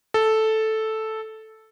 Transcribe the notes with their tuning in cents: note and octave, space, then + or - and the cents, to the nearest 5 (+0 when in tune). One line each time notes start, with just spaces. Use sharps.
A4 -5